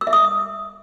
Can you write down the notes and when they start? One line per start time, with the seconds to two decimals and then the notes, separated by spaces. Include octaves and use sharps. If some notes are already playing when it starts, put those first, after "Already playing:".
0.01 E6
0.07 E5
0.13 D#6